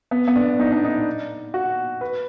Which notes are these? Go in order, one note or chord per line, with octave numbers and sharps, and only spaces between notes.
B3
B3
D4
D#4
D4
D#4
F#4
B4